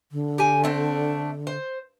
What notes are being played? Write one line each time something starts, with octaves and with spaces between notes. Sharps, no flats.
D3
G4 G#5
A3 C4 D4
C5